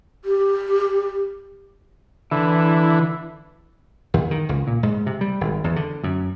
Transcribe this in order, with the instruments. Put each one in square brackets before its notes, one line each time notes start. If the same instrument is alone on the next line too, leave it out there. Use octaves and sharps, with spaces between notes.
[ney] G4
[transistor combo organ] D3 E4 [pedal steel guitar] E3
[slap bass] D#2
D#3
C#2
A#2
G#2
C3
G3
G#1
E2
D3
F#2